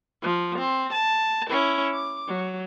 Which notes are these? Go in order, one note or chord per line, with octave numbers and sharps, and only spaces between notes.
F3
C4
A5
C#4 E4
D6
F#3